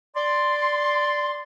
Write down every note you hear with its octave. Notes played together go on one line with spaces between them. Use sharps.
D5 C6